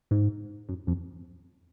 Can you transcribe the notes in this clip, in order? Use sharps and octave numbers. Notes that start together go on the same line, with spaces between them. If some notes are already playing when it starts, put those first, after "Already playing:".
G#2
F#2
F2